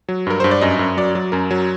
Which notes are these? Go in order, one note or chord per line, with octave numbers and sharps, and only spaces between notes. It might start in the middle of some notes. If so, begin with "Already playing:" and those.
F#3
G2 A#4
G2 C5
D5
F#2 D#5
F#2
F#3 D5
F#3
F#2 A#4
F#3